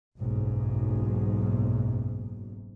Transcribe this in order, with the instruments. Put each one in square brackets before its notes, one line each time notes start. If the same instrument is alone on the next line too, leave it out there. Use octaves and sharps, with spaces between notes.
[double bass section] F#1 B1 G#2